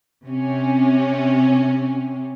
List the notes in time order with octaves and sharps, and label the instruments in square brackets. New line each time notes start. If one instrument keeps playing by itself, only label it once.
[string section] C3 C#4